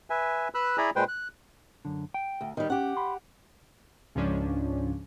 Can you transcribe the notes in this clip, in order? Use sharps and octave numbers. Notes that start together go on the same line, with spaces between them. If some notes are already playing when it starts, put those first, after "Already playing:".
B4 E5 G#5
B4 B5 E6 F#6
E4 G#4 D5 G#5 A#5 B5
A#2 G#3 B4 C5 G5
F#6
F#2 D3
G5
D2
D#3 G3
C#4 G4 F#5
B5 C6
C#2 G#2 F3 C#4 D4